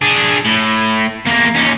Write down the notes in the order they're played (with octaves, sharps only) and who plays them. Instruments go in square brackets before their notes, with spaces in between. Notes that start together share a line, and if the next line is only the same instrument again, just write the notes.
[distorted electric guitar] D4 G#4
A2
E2 A#3
D#2 C#4